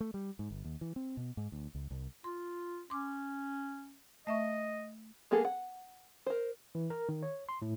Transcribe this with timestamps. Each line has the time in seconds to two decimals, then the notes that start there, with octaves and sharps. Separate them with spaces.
0.01 A3
0.14 G3
0.39 G#2
0.51 G1
0.64 D#2
0.81 E3
0.96 C4
1.17 B2
1.37 G#2
1.52 D2
1.75 C#2
1.91 C2
2.24 F4 C6
2.90 C#4 C6 D6
4.27 A3 D#5 E5 C#6
5.31 G#3 A#3 B3 G#4 A4
5.45 F#5
6.26 A#4 C5
6.75 E3
6.90 A#4
7.09 D#3
7.23 C#5
7.49 C6
7.62 A2